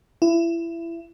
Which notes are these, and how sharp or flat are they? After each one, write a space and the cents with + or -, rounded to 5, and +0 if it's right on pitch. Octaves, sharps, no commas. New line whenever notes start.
E4 +25